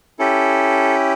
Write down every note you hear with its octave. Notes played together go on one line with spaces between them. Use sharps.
C#4 E4 G4 A4